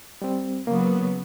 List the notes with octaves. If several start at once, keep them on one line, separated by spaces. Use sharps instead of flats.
G3 C4
C#3 F#3 A#3 B3